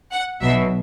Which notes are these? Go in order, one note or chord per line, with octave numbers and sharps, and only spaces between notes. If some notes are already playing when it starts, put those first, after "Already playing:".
F#5
B1 B2 F#3 E5